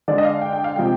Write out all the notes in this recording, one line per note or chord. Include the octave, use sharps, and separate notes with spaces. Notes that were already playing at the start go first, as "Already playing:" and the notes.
D3 G#3 D4 D5
D#5
F5
G5
G5
F5
C3 F3 G#3 G5